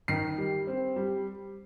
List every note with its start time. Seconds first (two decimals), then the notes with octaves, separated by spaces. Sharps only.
0.08 D#3 C7
0.38 G3
0.67 C4
0.96 G3